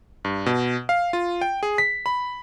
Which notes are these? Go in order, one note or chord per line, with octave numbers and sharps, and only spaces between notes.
G2
B2
F5
F4
G5
G#4
B6
B5